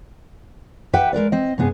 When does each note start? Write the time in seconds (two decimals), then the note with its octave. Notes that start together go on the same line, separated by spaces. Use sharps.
0.93 G4 B4 E5 F#5 G5
1.13 G#3 A#4 B4 D5
1.32 C4 D#5
1.58 G2 C3 B3 G#4